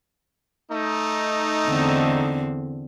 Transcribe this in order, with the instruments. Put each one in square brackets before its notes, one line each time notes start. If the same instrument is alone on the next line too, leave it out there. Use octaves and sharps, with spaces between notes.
[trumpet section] A3 D#4
[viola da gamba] E2 D3 C4